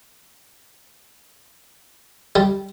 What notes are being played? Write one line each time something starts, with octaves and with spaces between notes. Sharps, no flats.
G3